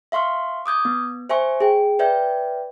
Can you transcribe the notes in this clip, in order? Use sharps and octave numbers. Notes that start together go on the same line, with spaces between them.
E5 F5 C6 C#6 F6
D6 D#6 G6 G#6
B3
C5 E5 G#5 C#6
G#4 G5
B4 D5 E5 G5 G6